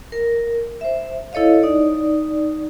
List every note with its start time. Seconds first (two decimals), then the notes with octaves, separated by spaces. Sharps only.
0.12 A#4
0.81 C5 E5
1.33 E4 A4 C#5 D#5 F5
1.63 D#4 D5